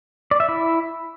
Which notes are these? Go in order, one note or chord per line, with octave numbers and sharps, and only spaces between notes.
D5
E5
E4